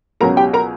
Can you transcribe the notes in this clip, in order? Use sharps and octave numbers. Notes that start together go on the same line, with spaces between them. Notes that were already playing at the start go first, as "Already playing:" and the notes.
C#2 B2 F#3 C#4 A#4 A#5
G4 G5
A#4 A#5